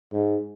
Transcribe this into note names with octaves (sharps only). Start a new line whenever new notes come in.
G#2